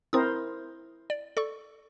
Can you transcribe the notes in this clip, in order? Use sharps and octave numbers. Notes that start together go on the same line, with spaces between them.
C4 E4 A#4 C5 D#6
D5
A4 D5 C#6